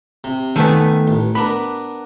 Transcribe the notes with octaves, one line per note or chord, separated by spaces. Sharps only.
C3
D#3 A3 B3 E5 G#5
A1
B3 D4 A#4 B5